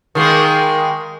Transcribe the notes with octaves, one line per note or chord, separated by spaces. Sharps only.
D#3 G#3 A#3